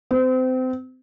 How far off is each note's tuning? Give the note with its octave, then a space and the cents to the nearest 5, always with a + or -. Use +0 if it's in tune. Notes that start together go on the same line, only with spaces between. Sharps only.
C4 -30